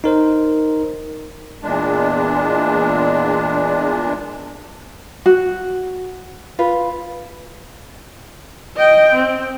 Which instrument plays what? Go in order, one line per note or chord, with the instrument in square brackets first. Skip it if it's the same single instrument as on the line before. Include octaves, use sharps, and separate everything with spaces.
[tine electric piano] D#4 A#4 C5
[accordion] E2 A#2 G#3 D4
[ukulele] F#4
F4 B4
[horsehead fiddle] D#5 G5
C4